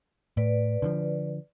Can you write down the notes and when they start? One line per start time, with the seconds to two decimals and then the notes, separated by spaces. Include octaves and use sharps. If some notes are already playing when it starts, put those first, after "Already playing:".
0.37 A2 B4 D5
0.82 D3 E3 F3